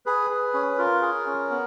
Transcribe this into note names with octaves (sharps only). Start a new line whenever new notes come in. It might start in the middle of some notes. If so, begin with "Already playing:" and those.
G#4 B4
G#4
C#4
F4 A#4
G#4
C#4
B3